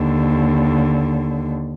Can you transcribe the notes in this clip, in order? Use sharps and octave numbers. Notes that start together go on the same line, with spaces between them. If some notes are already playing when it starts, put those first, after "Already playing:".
Already playing: D#2 D3